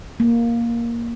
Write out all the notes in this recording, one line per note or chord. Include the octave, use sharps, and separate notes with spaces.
A#3